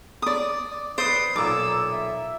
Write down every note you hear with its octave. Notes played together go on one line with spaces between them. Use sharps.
D5 D#6
B4 C5 D5 D#6
B1 A#2 D6 E6
E5